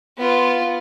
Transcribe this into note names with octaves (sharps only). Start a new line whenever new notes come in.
B3 F4